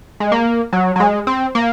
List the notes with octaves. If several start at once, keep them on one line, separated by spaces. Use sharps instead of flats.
G#3
A#3
F#3
F#3
G#3
C4
A#3